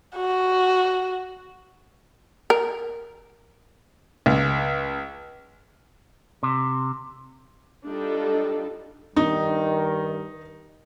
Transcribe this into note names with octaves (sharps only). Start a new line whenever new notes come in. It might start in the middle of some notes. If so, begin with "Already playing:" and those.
F#4
A#4
C#2
C3
G3 D4 D#4 F4 A4
G2 D#3 D#4